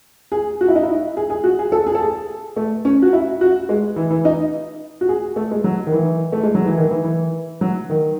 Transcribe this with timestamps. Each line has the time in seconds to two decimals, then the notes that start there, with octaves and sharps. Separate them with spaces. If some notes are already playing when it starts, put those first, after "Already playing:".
0.32 G#4
0.61 F#4
0.68 E4
0.75 D#4
0.83 E4
1.17 G#4
1.30 G#4
1.44 F#4
1.59 G#4
1.72 A4
1.86 G#4
1.95 A4
2.03 G#4
2.56 A3
2.85 C#4
3.02 F#4
3.13 E4
3.41 F#4
3.69 G#3
3.96 E3
4.11 E3
4.25 D#4
5.01 F#4
5.09 G#4
5.36 A3
5.51 G#3
5.64 F#3
5.87 D#3
5.92 E3
6.32 A3
6.43 G#3
6.55 F#3
6.65 E3
6.78 D#3
6.91 E3
7.04 E3
7.61 F#3
7.90 D#3